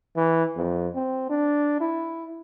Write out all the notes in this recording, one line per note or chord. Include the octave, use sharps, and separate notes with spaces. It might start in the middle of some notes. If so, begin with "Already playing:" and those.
E3
F2
C4
D4
E4